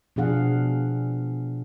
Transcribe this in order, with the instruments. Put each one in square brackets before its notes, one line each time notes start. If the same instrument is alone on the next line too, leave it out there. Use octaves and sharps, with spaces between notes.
[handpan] B2 F3 D4 G#4 F5 F#5